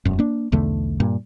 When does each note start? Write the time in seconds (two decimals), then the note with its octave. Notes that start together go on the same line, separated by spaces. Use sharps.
0.05 E1 F#2
0.19 A#3 D4
0.52 B1 E2 D3 A3
1.00 G2 A#2